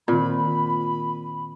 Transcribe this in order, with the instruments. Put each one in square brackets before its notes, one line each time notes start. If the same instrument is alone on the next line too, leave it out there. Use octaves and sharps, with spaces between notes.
[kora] A#2 [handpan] D#3 C4 [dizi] B5